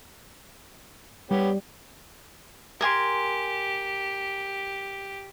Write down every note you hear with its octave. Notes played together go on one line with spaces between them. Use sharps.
G3 B3 G4 C#5
G4 A#4 G#5 C6